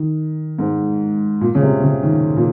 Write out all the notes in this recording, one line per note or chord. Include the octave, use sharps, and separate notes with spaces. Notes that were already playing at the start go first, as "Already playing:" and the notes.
Already playing: D#3
G#2
A#2
C#3
C3
C#3
D#3
A#2